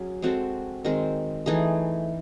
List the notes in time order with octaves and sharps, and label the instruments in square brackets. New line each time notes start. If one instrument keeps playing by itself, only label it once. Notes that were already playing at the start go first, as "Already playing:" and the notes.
Already playing: [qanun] F#3 C#4 G#4
G#3 C4 F#4 A4
D#3 G#3 C4
E3 A3 D#4 G#4